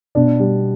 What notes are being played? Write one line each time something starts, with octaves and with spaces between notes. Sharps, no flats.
B2 D4
G3